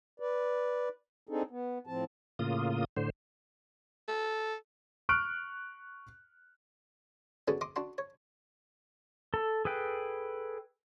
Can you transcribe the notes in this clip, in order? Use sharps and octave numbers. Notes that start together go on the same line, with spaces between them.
B4 D5
C4 D4 D#4 G#4 A4
B3
A2 F3 C4 A5
A2 C#3 A#3 F4 D#6
A2 D3 C5
A4
C#6 F6 F#6 D7
B3 C#4 D4 F#4 G#4 A4
D#5 C6 D6 D#6
D4 F#4 C6
C#5
A4
G#4 A4 B4 G5